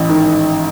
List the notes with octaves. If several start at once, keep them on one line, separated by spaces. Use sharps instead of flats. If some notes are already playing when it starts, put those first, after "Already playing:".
Already playing: A1 E4
G#2 D#3